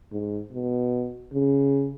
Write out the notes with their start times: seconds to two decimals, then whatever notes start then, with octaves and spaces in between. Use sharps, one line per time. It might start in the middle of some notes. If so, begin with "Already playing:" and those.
0.12 G#2
0.53 B2
1.34 C#3